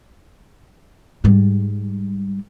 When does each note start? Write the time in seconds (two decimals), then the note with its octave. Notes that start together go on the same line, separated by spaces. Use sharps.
1.24 G#2 G3